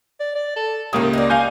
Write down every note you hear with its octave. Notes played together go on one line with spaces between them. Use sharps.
D5
D5
A4
C#2 A2 A#3 D#4 G4 D#6
D#4 D5
F5 G#5 G6